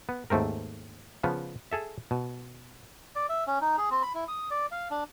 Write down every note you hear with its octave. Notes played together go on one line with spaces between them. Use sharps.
B3
D#2 G#2 A3 C4 A#4
C#3 F3 B3
G#4 A4 E5
B2
D5
E5
C#4
D#4
G#4
C4
B5
E4
D#6
D5
F5
D4